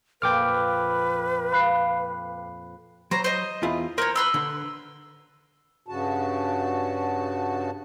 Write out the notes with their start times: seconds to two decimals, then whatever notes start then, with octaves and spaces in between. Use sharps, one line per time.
0.22 F2 A#2 B4 G5 D6 F6
1.52 F5 B5 F#6 C7
3.11 F#3 C5 A#5
3.24 C5 D#5
3.63 E2 E4 F4
3.98 A#4 C5 C#5
4.16 B4 C6 E6
4.34 D3
5.88 G2 C#3 F#4 A5